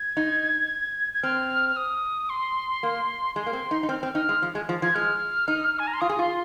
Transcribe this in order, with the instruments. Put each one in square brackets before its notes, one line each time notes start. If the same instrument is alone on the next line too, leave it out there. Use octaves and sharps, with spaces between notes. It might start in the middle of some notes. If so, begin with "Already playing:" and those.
Already playing: [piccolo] G#6
[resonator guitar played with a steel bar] D#4
[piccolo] G#6
[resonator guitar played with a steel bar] C4 [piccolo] F6
[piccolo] F6
D#6
C6
[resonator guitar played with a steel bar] A#3
[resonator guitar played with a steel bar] G#3 [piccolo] C6
[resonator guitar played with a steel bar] A#3
C4
D#4
D#4
[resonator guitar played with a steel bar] C4 [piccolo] F6
[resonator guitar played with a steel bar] C4
[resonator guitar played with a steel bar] D#4 [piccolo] F6
[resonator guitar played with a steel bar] G#3
F3
G#3
F3
[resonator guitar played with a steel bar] F3 [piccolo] G#6
[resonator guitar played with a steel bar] G#3 [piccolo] F6
[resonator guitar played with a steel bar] D#4
[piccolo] G#5
A#5
C6
[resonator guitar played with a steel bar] F4 [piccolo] D#6
[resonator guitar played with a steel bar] G#4
[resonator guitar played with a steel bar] F4 [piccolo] C6